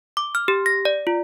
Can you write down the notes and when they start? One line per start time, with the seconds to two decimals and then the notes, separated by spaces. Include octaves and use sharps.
0.17 D6
0.35 F6
0.48 G4
0.66 A#6
0.85 D5
1.07 F4